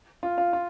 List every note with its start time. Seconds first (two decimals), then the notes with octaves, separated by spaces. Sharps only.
0.23 F4
0.38 F4
0.53 F4